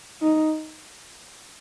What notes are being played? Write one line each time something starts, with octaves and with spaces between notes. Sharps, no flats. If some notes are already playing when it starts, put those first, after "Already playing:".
D#4